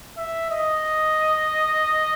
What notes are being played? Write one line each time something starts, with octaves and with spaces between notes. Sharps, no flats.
E5
D#5